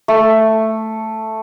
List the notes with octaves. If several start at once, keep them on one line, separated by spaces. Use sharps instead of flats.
A3